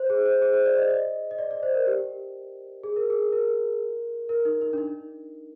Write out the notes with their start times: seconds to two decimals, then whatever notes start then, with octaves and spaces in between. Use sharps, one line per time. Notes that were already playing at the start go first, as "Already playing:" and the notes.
Already playing: C5
0.10 G#4
0.26 C5
0.42 G#4
0.54 C5
0.66 D5
0.78 D#5
0.90 D#5
1.31 D#5
1.38 D5
1.51 D5
1.63 C5
1.75 A#4
1.87 G4
2.83 G#4
2.96 A#4
3.10 G#4
3.32 A#4
4.29 A#4
4.45 D#4
4.61 D#4
4.73 D4
4.78 D#4